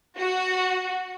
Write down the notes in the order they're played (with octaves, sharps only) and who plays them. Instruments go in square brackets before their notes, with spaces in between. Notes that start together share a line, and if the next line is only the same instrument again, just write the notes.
[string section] F#4